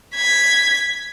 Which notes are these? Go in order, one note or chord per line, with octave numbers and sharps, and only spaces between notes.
G#6 B6